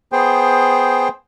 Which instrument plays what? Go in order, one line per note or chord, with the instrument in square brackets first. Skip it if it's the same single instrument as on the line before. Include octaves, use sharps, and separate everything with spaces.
[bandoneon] B3 G#4 C5 G5